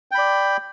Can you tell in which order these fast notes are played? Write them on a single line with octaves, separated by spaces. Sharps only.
G5 B5 D5